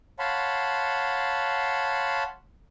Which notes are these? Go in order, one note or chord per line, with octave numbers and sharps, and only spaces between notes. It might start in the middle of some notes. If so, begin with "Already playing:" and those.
C#5 F5 F#5 A5 B5 C6